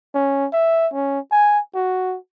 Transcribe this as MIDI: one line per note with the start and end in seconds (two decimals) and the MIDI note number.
0.15 0.47 61
0.53 0.87 76
0.93 1.19 61
1.32 1.59 80
1.75 2.17 66